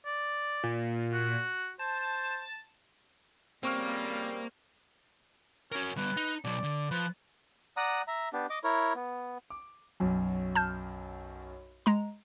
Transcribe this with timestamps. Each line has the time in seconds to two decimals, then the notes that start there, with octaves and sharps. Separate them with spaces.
0.06 D5
0.64 A#2
1.13 F#4
1.79 C5 A5
3.63 F2 C#3 G3 A#3 C4 C#6 F6
5.72 C#4 F#4 A#4
5.97 G3 B3 B4
6.17 D#4
6.44 B2 F#3 D5
6.63 D3
6.91 F3 B4
7.77 D5 F#5 A#5 D#6
8.08 E5 A#5
8.33 B3 D4 G4
8.50 D#5 D6
8.64 E4 A#4 C#5
8.95 B3
9.50 D6
10.00 B1 F#2
10.55 A5 F6 G6
11.86 G#3 A#5